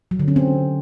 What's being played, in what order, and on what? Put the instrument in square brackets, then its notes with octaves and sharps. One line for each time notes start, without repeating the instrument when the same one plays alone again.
[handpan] F#3
D3
C#4
C4